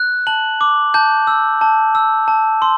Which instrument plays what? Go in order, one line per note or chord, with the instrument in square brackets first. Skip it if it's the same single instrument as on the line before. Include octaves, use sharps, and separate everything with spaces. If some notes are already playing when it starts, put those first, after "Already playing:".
Already playing: [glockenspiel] F#6
A5 F#7
D6
A5 G6
E6
A5
E6
A5
C6